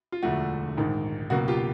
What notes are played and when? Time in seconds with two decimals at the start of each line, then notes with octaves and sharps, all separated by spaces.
0.12 F4
0.23 E1 D2 D3 F3 A3 F#4
0.77 A#1 G#2 D#3
1.30 C#2 B2 F#3 A#3 F#4
1.48 F4 G4